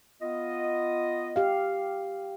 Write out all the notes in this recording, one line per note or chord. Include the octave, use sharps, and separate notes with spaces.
B3 F4 D#5
G4 F5